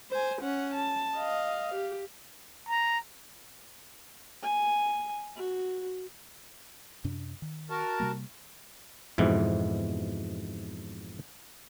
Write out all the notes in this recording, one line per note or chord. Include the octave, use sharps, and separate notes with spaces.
C5 G#5
C#4 F#5
A5
D#5 F5
G4
A#5
G#5
F#4
F#2 C3 D4
D#3
F#4 A#4 A5
C3 G3 A#3
F2 G#2 B2 E3